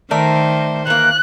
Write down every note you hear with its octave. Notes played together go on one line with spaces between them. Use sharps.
D#3 A3 A#4 C5 D5
E3 A#3 F#6